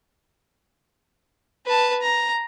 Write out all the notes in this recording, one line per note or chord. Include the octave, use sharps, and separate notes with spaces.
B4 A5
A#5